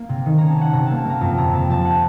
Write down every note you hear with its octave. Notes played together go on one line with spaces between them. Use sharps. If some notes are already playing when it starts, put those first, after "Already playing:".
Already playing: A#3
C3
D#3
C#4 A#5
A5
C#4 F#5
C3 A#5
A#3 A5
A5
A#3 A#5
F2 A5
C3 A#5
C3 A5
F3 A5
F#5